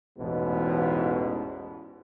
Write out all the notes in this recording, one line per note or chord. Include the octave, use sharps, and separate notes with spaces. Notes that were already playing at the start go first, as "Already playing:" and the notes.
A1 E2 G#2 B2